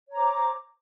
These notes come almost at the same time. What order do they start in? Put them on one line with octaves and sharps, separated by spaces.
C#5 A#5 C5 D6